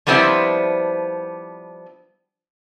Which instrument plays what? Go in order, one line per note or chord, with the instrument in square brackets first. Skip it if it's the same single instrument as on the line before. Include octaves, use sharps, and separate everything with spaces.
[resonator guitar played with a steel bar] F3 G3 B3 C4 D4 E4